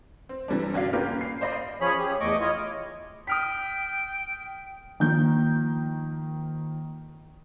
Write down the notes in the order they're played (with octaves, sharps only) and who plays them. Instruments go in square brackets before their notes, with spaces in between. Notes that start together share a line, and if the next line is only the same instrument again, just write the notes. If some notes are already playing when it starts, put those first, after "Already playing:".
[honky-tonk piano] C4
C3 E3 G3 C#4 D4
G1 C#4 F#4 D5 F5
A#3 C#4 F4 G4 A#4 B4
C7
C5 D5 D#5 F5 B5
[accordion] F3 C#4 G#4 C#5 B5
G4 G#4
E2 A3 D#5 C#6 D6
E4 F4 C#5 D#5
[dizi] G5 [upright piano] D#6 F6 B6
[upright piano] D#3 F3 A#3 G6